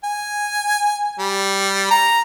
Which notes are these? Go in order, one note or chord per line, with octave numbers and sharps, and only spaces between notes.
G#5
G3
A#5